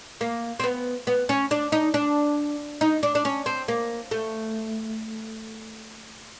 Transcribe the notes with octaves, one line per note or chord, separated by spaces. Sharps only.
A#3
C4
B3
B3
C#4
D4
D#4
D4
D#4
D4
D4
C#4
C4
A#3
A3